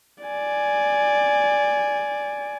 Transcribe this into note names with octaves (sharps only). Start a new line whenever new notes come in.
D5 G#5